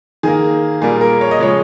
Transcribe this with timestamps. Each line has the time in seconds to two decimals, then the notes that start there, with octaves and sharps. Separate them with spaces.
0.23 D#3 A#3 G#4
0.82 A#2 G3 A#3 G#4
1.01 A#4
1.21 C#5
1.31 D#5
1.40 C#3 F3 G#3 C#5